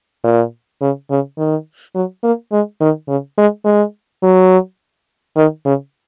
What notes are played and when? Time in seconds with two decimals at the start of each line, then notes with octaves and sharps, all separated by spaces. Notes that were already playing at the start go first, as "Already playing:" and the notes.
0.24 A#2
0.81 C#3
1.10 C#3
1.38 D#3
1.95 F#3
2.23 A#3
2.52 G#3
2.81 D#3
3.08 C#3
3.38 G#3
3.65 G#3
4.23 F#3
5.36 D#3
5.65 C#3